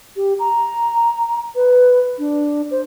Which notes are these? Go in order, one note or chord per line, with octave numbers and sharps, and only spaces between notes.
G4
A#5
B4
D4
C5